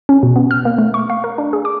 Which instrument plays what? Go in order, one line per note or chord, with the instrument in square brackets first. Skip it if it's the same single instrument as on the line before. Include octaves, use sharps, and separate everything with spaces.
[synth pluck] C#4
B2
B3
F6
A#3
A3
C#6
F5
A#4
D4
G#4
D6